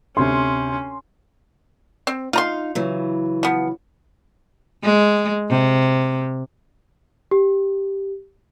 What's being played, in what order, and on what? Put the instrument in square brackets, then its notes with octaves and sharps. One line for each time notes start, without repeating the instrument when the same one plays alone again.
[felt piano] D2 C3 [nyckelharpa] C#4 [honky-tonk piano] C6
[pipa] C4
[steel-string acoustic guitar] D#4 F5 [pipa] F4 A#5 C6
[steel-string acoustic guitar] C#3 E3 F#3
[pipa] F3 B3
[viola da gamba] G#3
C3
[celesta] G4